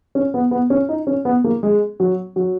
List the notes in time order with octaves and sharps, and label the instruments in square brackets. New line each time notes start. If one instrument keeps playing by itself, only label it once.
[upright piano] C#4
B3
B3
C#4
D#4
C#4
B3
A#3
G#3
F#3
F#3